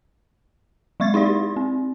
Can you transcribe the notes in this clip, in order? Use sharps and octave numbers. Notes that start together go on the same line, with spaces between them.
F#3 G#3 C#6 G#6 A6
D#4 E4 G4 D5
C4